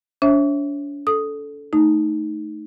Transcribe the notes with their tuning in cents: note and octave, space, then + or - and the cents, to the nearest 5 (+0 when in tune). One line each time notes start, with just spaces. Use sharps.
D4 -40 C#5 -45 E5 +0
A4 -10 D#6 +0
A3 -5 D#4 +0